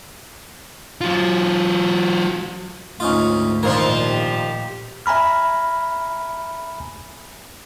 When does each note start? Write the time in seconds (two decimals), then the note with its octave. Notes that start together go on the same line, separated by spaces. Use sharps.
1.01 F#3 F4
3.00 D2 G#2 C#4 D#4 F4
3.63 A#2 D#3 F3 D4 A#4 C5
4.03 G4
5.06 E5 G#5 A#5 B5 F6